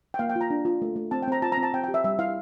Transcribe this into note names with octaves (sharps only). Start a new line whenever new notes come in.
G5
A#3 F5
G5
F4
A#5
D4
F4
A3
A3
C4 A5
G5
C4 A#5
F4 A5
A#5
C4
A5
C4 G5
G5
G4
E5
G3 E5
E4 F5